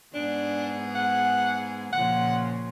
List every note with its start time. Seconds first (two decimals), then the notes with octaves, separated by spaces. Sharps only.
0.15 G#2 B3 D4 G#4
0.95 F#5
1.93 A#2 C#3 F3 F#5